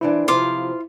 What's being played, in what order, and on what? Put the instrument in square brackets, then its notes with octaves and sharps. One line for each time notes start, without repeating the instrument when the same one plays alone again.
[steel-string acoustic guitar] E3 D4 C5 [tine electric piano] E4
[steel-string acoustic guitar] C3 F3 C4 [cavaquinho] F4 F5 D6